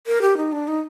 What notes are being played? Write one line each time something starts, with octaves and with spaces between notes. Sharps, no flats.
A#4
G4
D#4
D4
D#4